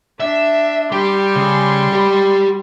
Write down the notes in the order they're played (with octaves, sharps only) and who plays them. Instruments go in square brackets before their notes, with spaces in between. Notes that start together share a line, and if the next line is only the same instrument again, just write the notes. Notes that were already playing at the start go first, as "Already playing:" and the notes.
[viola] D4 [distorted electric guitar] E5
[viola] G3 C6 [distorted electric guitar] G4
[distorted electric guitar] C#3
G4 B5